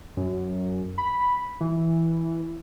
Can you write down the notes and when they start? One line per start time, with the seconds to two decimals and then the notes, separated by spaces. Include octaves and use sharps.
0.17 F#2
0.98 B5
1.61 E3